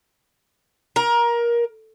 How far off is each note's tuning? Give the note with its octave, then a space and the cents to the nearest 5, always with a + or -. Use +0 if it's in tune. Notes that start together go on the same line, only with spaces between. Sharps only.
A#4 +20